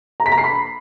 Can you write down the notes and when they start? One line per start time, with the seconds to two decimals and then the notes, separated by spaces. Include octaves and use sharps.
0.20 A#5
0.26 B6
0.32 A#5
0.38 C7
0.44 B5